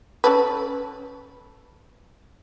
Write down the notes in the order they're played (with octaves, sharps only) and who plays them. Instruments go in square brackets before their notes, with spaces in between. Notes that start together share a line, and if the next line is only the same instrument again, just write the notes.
[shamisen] C#4 A4 B4